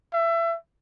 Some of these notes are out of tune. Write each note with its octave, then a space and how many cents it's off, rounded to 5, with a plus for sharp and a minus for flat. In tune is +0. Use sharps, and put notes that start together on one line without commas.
E5 +25